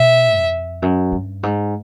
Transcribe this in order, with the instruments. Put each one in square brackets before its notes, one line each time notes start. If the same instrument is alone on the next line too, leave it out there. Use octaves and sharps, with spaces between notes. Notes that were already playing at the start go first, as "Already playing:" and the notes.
Already playing: [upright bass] B2 [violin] E5
[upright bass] F2
F#2
G2
G#2